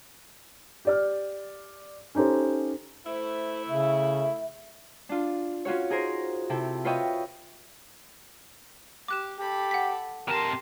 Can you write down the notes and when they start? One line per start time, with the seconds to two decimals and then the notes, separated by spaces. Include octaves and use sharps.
0.85 G4 D5 F6
2.15 C#4 D#4 G4 A4 C5
3.06 A3 E4 C5
3.68 C#3 E5
5.09 D4 F4
5.65 C#4 F4 F#4 C#5
5.90 D#4 G#4 A#4 C5
6.50 C3 C4 E4 A4
6.85 F4 B4 C#5 D#5 E5 G5
9.08 G4 D6 F#6 E7
9.40 G4 A4 B5
9.71 F#5 B6
10.28 C3 G4 A#4 A5 C6